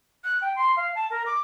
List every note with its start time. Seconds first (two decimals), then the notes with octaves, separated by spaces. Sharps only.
0.24 F#6
0.41 G5
0.56 C6
0.76 F5
0.95 A5
1.10 A#4
1.26 D6